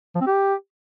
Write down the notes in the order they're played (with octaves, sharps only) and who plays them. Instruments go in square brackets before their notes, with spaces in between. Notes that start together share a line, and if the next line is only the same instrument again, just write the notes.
[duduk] F3
C4
G4